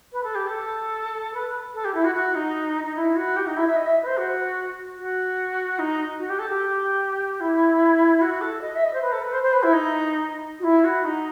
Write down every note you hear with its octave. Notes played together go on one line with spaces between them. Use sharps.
B4
A4
G4
A4
B4
A4
G4
E4
F#4
F#4
D#4
D#4
E4
F#4
G4
D#4
E4
E5
D#5
E5
B4
C5
F#4
F#4
D#4
F#4
G4
A4
G4
E4
F#4
A4
D#5
E5
D#5
C5
B4
A4
B4
C5
C5
B4
E4
D#4
F#4
E4
F#4
D#4